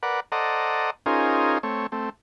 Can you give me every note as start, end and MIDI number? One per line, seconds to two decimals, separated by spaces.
0.03 0.20 70
0.03 0.20 71
0.03 0.20 74
0.03 0.20 78
0.32 0.90 69
0.32 0.90 72
0.32 0.90 74
0.32 0.90 75
0.32 0.90 78
0.32 0.90 82
1.06 1.58 61
1.06 1.58 63
1.06 1.58 65
1.06 1.58 68
1.06 1.58 70
1.06 1.58 72
1.63 1.87 57
1.63 1.87 60
1.63 1.87 73
1.92 2.09 57
1.92 2.09 60